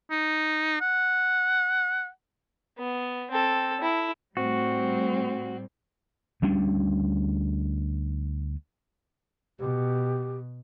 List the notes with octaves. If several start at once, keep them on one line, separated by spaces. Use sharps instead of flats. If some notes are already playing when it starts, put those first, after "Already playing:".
D#4
F#5
B3
C4 A4
E4
A2 G3 C4 F#4
D2 G3 C#4 D4
B2 G4